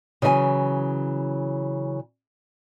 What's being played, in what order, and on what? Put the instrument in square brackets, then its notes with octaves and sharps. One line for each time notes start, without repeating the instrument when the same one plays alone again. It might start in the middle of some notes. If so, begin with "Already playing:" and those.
[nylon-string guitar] C#3 E3 F#3 D#5 G#5